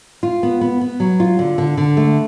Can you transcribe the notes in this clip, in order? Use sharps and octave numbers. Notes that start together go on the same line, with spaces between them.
F4
B3
B3
B3
F#3
F4
D3
D3
D3
A3